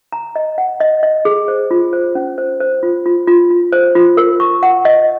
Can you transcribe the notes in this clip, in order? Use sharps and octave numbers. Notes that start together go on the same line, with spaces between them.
A#5
D#5
F#5
D#5
D#5
G#4
C5
F4
C5
C#4
C5
C5
F4
F4
F4
F4
C5
F4
A#4
C#6
F#5
D#5